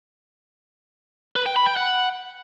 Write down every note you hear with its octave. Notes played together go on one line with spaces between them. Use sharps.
B4
G5
B5
G5
F#5